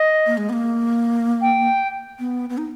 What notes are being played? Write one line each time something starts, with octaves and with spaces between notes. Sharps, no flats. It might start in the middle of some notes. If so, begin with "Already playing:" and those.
Already playing: D#5
A#3
G#3
B3
A#3
G5
B3
B3
D#4